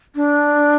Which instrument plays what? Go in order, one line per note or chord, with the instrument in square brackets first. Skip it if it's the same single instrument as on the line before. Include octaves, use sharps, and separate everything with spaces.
[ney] D4